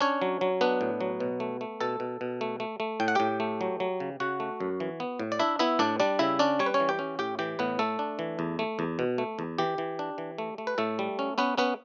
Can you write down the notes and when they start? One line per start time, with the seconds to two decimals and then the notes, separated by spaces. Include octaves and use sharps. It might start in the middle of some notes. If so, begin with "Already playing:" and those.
0.01 C#4 D4 C#5
0.22 F#3
0.41 F#3
0.61 B3 D4 B4
0.81 A2
1.01 F#3
1.20 B2
1.40 A3
1.61 A3
1.81 B2 A4 A5
2.00 B2
2.21 B2
2.41 A3
2.60 A3
2.80 A3
3.00 A2 G5
3.08 F#5
3.15 A2 G4 G5
3.40 A3
3.61 F#3
3.80 F#3
4.00 C#3
4.20 C#3 F#4 F#5
4.40 A3
4.60 F#2
4.80 E3
5.00 B3
5.19 A2
5.32 D5
5.39 D4 E4 E5
5.59 B3 E4 E5
5.79 A2 D4 D5
6.00 G3 D4 D5
6.19 C#3 E4 E5
6.39 C#4 D4 D5
6.59 G3 C#5
6.66 B4
6.74 C#4 C#5
6.80 E3
6.89 G4 G5
6.99 C#4
7.19 A2 G4 G5
7.39 E3 G4 G5
7.59 A2 B3 B4
7.79 A3 A4
7.99 D4
8.19 E3
8.39 E2
8.59 A3
8.79 E2
8.99 B2
9.18 A3
9.39 E2
9.58 E3 G4
9.78 E3
9.99 D4
10.18 E3
10.38 A3
10.58 A3
10.67 B4
10.78 A2 A3 A4
10.99 G3
11.19 C#4
11.38 B3 C#4 B4
11.58 B3 C#4 B4